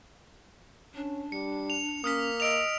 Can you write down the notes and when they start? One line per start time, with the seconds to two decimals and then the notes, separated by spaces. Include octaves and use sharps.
0.95 C#4 D4
1.32 G3 C#7
1.70 F7
2.04 A#3 C#4 D#6 F6 B6
2.40 D#5 E6 D7 F7